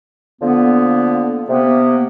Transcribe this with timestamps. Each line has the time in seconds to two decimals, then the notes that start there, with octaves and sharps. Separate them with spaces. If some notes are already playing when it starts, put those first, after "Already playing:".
0.42 D3 F3 A#3 B3
1.49 C3 A#3 B3